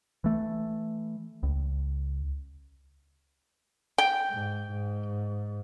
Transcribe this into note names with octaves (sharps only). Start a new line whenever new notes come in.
E3 A3
C#2
G5
G#2
G#2